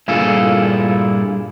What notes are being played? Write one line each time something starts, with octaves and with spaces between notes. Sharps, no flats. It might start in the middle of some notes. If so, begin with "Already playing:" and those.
G2 A#2 E4 F4 G#4 A4